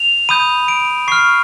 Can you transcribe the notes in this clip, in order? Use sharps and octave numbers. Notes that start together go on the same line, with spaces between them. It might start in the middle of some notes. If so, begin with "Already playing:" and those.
Already playing: F7
B5 D#6 G6 D#7
D7
C#6 F6 C7